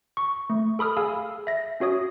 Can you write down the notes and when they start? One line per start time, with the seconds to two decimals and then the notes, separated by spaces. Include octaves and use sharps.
0.17 C#6
0.50 A3
0.79 A4 B5 D#6 F6
0.97 G#4 F5 G#5 E6
1.47 E5 A#6
1.80 C#4 F#4 C#5 D#6